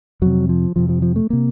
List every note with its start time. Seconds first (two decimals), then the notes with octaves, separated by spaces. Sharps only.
0.22 F2 C3 F#3
0.49 F3
0.76 F2 C3 F3
0.89 F3
1.02 F3
1.16 A3
1.30 C3 A#3